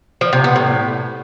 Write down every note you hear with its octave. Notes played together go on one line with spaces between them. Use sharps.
F3
C3
B3
A2